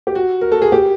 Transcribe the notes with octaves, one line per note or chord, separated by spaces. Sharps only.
G4
F#4
A#4
A4
G#4
G4